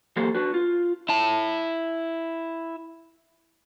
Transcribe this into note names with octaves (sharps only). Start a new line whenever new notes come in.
E3 F#3 A#3 G4 A4 C5
D4 F#4 B4
F4
E4 A5